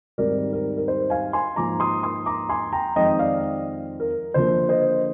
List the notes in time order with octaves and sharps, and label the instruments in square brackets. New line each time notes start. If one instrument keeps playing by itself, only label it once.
[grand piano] G#2 D#3 G3 C4 A#4 D5
A#4
A#4
C5
F5 G#5
G#5 C6
G#2 F3 A#3 A#5 D6
C6 D#6
C6 D#6
A#5 D6
G#5 C6
G5 A#5
F2 D#3 G#3 C4 D#5 G5
D5 F5
A#4
D3 F3 A#3 C5
C5 D#5